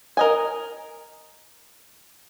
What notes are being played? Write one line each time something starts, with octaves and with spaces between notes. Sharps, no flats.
A#4 D#5 G#5